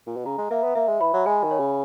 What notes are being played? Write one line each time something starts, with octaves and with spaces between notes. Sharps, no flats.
A#2
B2
C#3 A#5
G#3
A#3 E5
B3
A#3 E5
G#3
E3 B5
F#3
G#3 G#5
D#3
C#5
C#3